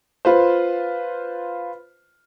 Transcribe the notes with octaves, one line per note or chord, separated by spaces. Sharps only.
F4 B4 C5